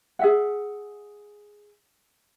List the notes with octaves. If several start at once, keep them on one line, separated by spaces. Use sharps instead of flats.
G#4 E5 F#5